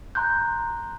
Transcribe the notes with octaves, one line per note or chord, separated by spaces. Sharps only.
A#5 C6 F#6 G6